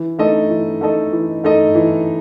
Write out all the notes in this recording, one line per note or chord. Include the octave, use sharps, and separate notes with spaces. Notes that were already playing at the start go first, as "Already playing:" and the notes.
Already playing: E3
A3 D#4 A4 D#5
E3
A3 D#4 A4 D#5
E3
A3 D#4 A4 D#5
E3